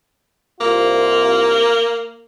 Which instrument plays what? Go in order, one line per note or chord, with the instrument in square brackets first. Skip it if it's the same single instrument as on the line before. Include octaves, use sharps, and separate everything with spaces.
[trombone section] C2 F4 [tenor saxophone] A#3